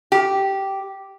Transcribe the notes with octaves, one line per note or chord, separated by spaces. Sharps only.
G4